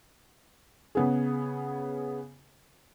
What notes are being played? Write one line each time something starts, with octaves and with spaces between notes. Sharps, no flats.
C#3 B3 G#4